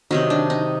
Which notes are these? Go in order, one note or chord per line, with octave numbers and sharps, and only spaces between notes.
C3 D#3 F#3 D#4
D4
D#4